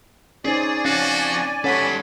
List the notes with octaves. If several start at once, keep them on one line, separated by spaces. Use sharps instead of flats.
C#4 D#4 G#4 C5 D5 G#5
C4 C#4 F#4 F5
G3 C#4 A4 C#5 F#5 B5